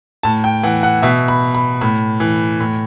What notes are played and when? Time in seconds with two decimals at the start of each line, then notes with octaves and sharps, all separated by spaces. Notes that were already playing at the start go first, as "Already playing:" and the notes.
0.23 A2 A5
0.44 G5
0.63 E3 F#5
0.83 F#5
1.02 B2 E5
1.28 B5
1.55 B5
1.81 A2 B5
2.20 E3
2.60 A2